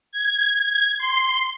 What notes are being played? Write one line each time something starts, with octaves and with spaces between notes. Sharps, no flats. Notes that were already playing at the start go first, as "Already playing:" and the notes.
G#6
C6